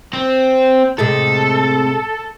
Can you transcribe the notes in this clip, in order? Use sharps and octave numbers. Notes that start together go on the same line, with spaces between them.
C4
A2 C3 G#3 A4